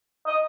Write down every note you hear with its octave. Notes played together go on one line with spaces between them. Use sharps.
D#5